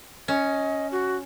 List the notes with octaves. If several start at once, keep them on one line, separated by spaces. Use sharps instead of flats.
C#4 D#5
F#4